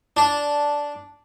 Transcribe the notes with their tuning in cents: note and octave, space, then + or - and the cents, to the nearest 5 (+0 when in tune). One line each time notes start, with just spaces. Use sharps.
D4 -5